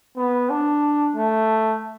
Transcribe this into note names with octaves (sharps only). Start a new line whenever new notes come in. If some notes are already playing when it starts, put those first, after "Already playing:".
B3
D4
A3